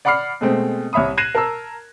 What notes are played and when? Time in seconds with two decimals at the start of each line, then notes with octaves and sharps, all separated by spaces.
0.05 D5 F#5 B5 D6 F6 C7
0.41 B2 G#3 A3 C4
0.93 C2 C#5 E5 B5 D#6
1.17 F#6 G#6 A#6 C7 D#7 E7
1.35 A#4 A5 E6